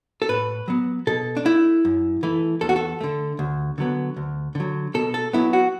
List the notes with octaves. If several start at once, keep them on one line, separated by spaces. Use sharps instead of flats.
A4
A2 B4
F#3 B3
B2 A4
D4
A3 E4
F#2
E3 A3
E2 A4
F#4
A4
D3 A3
D2
D3 F#3 B3
D2
D3 F#3
B2 A4
A4
F#3 B3 E4
F#4